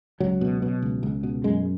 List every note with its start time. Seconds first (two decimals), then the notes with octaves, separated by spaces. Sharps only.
0.20 C#2 F#3
0.41 B2
0.62 B2
0.82 C#2
1.03 C#2
1.23 B2
1.44 F#2 G#3